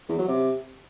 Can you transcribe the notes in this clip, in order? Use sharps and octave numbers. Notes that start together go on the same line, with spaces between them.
E2
F#3
C3